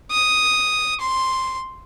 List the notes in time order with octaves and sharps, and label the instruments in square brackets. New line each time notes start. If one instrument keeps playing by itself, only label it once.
[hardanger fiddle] D#6
C6